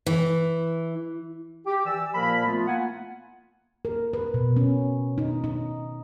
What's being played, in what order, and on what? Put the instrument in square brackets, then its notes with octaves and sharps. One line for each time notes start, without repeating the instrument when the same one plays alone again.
[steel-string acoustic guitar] E3
[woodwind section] G4
E3 D5 E6
A#2 F3 A#3 A#4 B5
A3 B3 F4
A#3 E4 F#5 G#5
[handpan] A#4
B4
B2
C#4
D#4
D#4